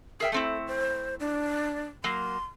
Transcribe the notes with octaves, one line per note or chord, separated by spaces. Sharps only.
G#4 A#4 E5 G5
A3 C4 E4 A4
C5
D4
F#3 A#3 C6